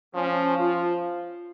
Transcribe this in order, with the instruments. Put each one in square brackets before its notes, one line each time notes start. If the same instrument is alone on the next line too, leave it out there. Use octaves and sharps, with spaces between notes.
[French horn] F3 [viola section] C#4
[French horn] F3 [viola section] F4